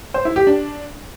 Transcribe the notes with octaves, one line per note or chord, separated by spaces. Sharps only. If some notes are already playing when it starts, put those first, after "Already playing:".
C5
E4
G4
D4